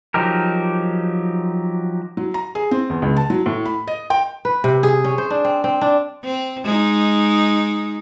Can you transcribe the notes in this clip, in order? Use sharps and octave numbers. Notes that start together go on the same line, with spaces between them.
F3 F#3 D#4 G4 A#4
F#3
A#5
G#4
C4
E2
C#2
A5
F#3
A2
B5
D#5
G5
B4
C3
G#4
C#4
C5
D4
C4
C4
D4
C4
G#3 D#4